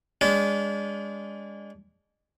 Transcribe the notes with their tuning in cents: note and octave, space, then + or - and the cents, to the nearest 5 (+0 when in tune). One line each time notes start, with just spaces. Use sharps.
G#3 -30 D4 -35